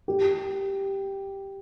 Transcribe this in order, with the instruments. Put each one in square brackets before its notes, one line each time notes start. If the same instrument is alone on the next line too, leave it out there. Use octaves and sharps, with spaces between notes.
[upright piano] G4